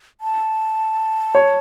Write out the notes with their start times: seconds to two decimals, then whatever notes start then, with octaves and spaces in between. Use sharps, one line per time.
0.21 A5
1.35 C#5